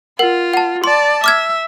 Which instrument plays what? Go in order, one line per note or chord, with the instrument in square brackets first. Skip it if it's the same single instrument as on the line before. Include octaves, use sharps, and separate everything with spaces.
[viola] F4 [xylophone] A#4 F#5
[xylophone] F#5 A5
[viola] D5 A5 [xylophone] C6
[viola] E5 [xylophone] D6 F6 G#6